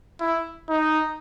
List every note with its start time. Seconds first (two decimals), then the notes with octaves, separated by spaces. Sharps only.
0.20 E4
0.69 D#4